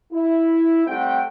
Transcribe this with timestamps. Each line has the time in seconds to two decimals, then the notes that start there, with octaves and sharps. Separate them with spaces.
0.12 E4
0.87 G3 A3 C4 F#5 G5